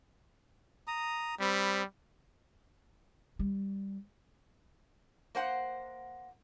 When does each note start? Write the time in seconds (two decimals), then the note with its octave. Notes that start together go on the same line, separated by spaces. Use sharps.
0.87 A#5 D#6
1.40 G3 C4 B5
3.39 G3
5.35 A#3 C5 F#5